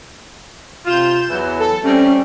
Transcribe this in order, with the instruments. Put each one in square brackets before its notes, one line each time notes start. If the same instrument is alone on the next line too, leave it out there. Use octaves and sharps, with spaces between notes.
[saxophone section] C3 F4 [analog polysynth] G6 E7
[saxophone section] E2 E3 F#3
[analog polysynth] A4
[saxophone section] G3 A3 C4 [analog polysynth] C#4